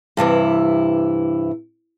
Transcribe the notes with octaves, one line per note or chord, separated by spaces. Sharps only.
G2 C3 E3 E4